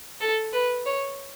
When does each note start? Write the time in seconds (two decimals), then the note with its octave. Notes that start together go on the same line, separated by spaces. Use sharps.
0.21 A4
0.53 B4
0.86 C#5